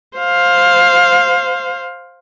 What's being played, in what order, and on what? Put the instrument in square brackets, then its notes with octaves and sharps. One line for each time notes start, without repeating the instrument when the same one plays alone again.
[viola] C5 F5